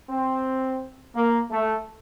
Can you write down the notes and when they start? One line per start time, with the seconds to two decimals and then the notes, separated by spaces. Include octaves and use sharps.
0.10 C4
1.15 A#3
1.51 A3